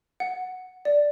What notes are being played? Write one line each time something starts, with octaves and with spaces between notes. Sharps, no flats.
F#5
D5